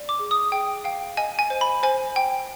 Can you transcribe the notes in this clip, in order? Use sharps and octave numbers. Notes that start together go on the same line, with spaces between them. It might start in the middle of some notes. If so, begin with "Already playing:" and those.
Already playing: D5
D6
G#4
D#6
G#4 G5
F5 G5
D#5 G#5
G#5
C5
B5
C5 G#5
G5